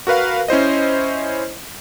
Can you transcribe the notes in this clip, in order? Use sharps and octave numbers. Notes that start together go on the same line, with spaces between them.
F#4 A#4 B4 F5
C#4 E4 C5 D#5